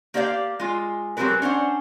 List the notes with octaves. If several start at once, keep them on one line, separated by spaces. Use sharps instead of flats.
A#3 G4 C5 D5 E5 F5
G#3 F4
F#3 G#3 C4 G4 A#4 B4
C#4 D4 C5 F#5